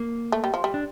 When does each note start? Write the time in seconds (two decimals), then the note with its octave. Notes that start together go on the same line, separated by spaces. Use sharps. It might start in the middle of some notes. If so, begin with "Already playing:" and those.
Already playing: A#3
0.32 A3
0.44 G3
0.54 F3
0.64 G3
0.74 D4